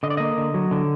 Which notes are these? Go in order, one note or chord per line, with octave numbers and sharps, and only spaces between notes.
D3 D#5
D5
A#3 D#5
D3
F#3
D3